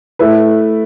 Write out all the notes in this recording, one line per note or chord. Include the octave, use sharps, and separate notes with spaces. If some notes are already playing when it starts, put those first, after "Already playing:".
A3 E4 B4